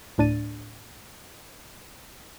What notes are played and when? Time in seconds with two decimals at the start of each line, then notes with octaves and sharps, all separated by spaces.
0.18 D2 A2 D4 A6 D#7